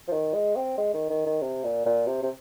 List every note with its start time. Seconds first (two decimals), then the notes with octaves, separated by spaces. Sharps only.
0.08 F3
0.13 D#3
0.34 G#3
0.56 C4
0.78 G#3
0.94 D#3
1.10 D#3
1.26 D#3
1.42 C3
1.64 A#2
1.86 A#2
2.07 C3
2.23 C3